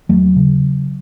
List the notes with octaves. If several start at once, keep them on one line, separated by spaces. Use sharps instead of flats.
D#2 F#3 A3
C#3